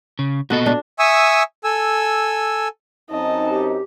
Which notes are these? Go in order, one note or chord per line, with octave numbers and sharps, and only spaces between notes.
C#3
A#2 B3 F#4 A4 D#5
D4
E5 G#5 C#6 D#6 E6
A4 G#5 E6
F#2 C4 D#4 D#5 A5
G4